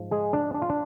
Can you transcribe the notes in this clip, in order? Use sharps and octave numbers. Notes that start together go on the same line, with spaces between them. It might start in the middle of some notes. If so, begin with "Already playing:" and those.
Already playing: G#2 F3
G#3 G#4
D4
D4
F4
D4